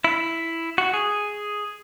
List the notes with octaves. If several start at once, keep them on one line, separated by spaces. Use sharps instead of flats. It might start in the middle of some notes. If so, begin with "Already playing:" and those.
E4
F#4
G#4